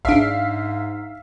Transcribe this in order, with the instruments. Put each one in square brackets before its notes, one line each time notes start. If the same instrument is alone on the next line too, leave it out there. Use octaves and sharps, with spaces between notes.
[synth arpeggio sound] G#1 D4 [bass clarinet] G#2 [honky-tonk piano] E5 F5